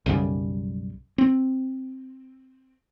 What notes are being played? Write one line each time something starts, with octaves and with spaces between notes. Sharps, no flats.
B1 F#2 C#3 G3
C4